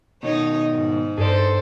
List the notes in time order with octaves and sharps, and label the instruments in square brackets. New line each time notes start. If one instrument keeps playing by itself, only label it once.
[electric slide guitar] B2 D#3 [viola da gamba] D#4 C#5 D#5
[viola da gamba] G#2
[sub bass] G2 [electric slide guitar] G#4 D5 [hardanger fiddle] A4 C5